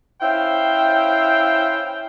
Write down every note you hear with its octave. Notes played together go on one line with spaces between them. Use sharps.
C#4 E4 C5 E5 F5 G5